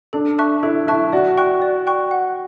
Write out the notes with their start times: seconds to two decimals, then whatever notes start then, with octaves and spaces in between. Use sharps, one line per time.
0.13 D4 A4
0.38 E5 A5 C#6 F#6
0.63 E4 A4
0.87 E4 E5 A5 C#6 F#6
1.12 F#4 D5
1.38 G5 C#6 F#6
1.62 D5
1.87 G5 C#6 F#6
2.11 F#5